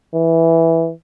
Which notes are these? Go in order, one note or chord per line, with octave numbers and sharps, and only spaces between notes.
E3